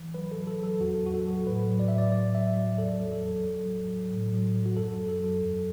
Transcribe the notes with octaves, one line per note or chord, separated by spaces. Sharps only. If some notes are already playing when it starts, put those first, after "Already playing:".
Already playing: E3
F#3 B4
F#3 A4
A4
F#3
A4
E2 F#4
E2 F#4
A4
F#3
A2 B4
F#3
D5
A2 E5
D5
F#3 D5
F#3 E5
F#3 D5
E2 A4
F#3
A4
E2
F#3
F#3
F#3
A2
F#3
F#3
F#4
F#2 A4
F#3
A4
F#3
E2